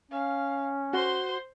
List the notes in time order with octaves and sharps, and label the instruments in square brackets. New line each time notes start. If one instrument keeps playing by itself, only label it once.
[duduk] C#4 [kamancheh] F5
[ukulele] F#4 [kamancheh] C5 C6